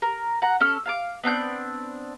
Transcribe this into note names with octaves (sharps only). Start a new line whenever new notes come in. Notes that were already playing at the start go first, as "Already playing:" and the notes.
A#4
F#5 A#5
C#4 A4 F6
F5 A5 D6
B3 C4 D4 G6